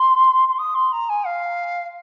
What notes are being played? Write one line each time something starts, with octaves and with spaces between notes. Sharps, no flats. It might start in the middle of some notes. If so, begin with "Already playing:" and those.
Already playing: C6
C6
D#6
C6
A#5
G#5
F5